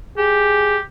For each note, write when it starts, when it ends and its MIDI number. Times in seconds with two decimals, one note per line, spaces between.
0.18 0.81 67
0.18 0.79 68